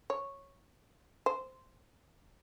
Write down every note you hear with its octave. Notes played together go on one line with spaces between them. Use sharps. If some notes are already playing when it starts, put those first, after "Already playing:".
C#5
C5